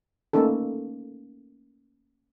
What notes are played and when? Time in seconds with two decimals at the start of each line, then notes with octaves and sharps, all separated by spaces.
0.33 A3 A#3 C#4 D#4 A4